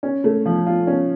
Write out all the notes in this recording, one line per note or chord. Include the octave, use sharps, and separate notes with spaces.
C#4
A3
F3
F4
C#4